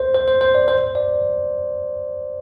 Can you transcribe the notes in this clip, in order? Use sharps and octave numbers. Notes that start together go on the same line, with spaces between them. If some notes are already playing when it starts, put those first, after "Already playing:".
Already playing: C5
C5
C5
C5
D5
C5
D5